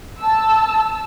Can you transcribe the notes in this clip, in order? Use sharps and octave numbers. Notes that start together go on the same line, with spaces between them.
A5 E6